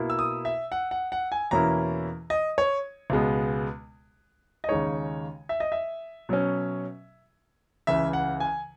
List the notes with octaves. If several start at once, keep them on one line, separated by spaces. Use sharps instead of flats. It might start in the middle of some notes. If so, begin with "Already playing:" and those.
Already playing: B2 A#3 E4
E6
D#6
E5
F#5
F#5
F#5
G#5
E2 B2 A#3 C#4 E4 A#5
D#5
C#5
C#2 B2 G#3 B3
D#5
D#2 C#3 G#3 D#4 C#5
E5
D#5
E5
B2 F#3 C#4
C#2 C#3 E3 E5
F#5
G#5